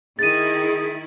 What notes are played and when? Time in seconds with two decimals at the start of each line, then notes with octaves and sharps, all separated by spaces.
0.19 D#3 E4 G#4 A6 D#7